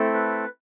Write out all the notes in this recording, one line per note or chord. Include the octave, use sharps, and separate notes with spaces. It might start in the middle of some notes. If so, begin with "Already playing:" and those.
Already playing: A3 C4 E4 A4
B4